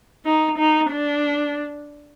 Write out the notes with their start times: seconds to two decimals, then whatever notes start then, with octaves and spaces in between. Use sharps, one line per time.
0.26 D#4
0.58 D#4
0.91 D4